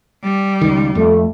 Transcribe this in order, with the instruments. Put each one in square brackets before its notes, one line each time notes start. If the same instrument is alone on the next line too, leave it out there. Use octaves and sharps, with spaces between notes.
[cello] G3
[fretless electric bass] C#2 D#3
[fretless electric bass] F2 [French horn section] A3